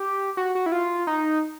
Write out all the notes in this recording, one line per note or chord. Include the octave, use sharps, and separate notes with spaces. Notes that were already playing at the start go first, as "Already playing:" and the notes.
Already playing: G4
F#4
F#4
E4
F4
D#4